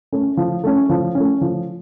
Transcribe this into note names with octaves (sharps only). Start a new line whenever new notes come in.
A3 C#4
F3
A3 C#4
F3
C#4
A3
F3